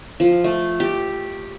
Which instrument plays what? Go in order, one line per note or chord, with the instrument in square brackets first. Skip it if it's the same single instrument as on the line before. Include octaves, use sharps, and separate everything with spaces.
[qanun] F3
A3
G4